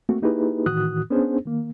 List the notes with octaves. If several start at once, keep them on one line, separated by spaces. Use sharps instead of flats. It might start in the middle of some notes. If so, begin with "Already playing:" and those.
A3 A#3 C4 F#4
A#3 D#4 E4 G4 G#4 B4
A2 D#3 E3 F#4 D#6 F#6
B3 C#4 D4 G#4 C5
D#3 A#3